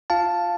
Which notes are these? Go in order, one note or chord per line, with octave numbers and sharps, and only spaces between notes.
F4 F5 A5